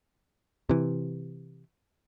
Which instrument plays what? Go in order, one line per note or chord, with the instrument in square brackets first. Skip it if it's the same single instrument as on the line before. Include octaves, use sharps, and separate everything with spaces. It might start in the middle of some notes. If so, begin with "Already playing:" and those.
[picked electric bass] C3 E3